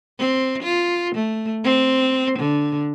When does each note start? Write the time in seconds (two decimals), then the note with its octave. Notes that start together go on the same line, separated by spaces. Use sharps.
0.19 C4
0.63 F4
1.15 A3
1.64 C4
2.39 D3